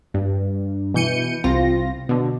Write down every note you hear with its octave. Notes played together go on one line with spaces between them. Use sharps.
G2
B2 E3 G6 C#7 D#7
C2 C4 F4 A#6
B2 D3